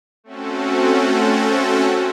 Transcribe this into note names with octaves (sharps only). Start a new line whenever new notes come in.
A3 C4 C#4 F#4 A4